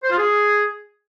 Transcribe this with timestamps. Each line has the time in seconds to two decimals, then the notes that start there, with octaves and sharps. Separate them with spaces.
0.03 C5
0.10 F4
0.17 G#4